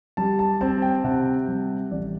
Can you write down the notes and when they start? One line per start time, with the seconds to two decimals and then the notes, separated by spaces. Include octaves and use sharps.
0.17 G3 A5
0.39 A5
0.61 C4 A5
0.82 G5
1.04 C3 F#5
1.48 G3
1.91 A1 D5